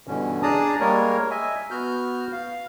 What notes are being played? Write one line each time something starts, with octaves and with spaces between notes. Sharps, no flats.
G2 B2 D3 E3 C#4
D4 G#4 D5 A5 A#5 D#6
G3 G#3 A#3 A#4 C#5
D#5 E5 G#5
B3 F#4 F6 G6
F5